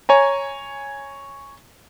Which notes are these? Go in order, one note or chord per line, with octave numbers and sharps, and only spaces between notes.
C#5 G#5 A#5